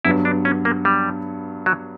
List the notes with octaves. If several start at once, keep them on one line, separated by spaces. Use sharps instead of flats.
G2 F#3 B3 E4
D4
C#4
A#3
G3
F#3